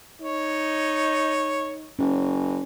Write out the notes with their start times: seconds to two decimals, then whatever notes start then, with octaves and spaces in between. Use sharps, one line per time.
0.21 D#4 C#5
1.99 F#1 C#4